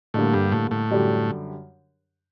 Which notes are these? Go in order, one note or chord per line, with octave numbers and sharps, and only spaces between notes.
A2 D3 G3 A#3
G2
A2
A2
F#2 D3 G3 D4 G4